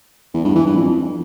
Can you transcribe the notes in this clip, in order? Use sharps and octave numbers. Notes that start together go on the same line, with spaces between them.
E2
G2
E3
G2
F2